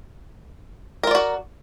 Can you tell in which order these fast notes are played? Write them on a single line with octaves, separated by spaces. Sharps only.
A#4 F4 D5 F#4